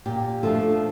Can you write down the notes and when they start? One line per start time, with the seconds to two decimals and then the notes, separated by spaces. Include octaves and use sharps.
0.06 A#2 G4
0.43 F3 A3 D4 F4 A4